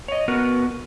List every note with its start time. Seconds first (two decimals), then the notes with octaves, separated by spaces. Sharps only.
0.08 C#5 D#5
0.28 B3 F#4 A#4 B4